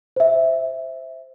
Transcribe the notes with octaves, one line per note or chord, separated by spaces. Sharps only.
C5 E5